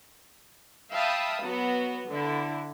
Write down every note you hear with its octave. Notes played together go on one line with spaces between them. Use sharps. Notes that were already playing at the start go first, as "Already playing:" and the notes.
E5 F5 G5 A5 B5 D#6
F#3 B3 F#4
D3 E4